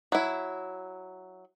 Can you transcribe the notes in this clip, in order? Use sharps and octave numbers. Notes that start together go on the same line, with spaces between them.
F#3 E4